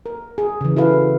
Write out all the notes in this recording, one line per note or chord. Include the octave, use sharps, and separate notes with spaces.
A#4
G#4
C#3 E3
E4 F#4 A4 B4 F5